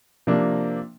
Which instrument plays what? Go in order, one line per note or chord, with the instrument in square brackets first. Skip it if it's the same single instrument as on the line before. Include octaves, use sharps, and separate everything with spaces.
[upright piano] C3 F3 A#3 D4